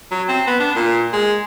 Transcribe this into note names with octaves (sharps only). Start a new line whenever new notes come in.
F#3
C4
B3
D4
A#2
G#3